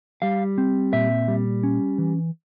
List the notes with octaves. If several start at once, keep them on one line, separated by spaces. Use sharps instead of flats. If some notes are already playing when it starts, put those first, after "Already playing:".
G3 F5
C4
A#2 E5
G3
C#4
E3